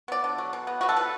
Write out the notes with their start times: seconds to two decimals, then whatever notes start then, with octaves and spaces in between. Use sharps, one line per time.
0.08 B3 D5
0.24 D3
0.38 F#3
0.53 B2
0.67 B3
0.81 B3 F#4
0.89 A4
0.97 B2 B4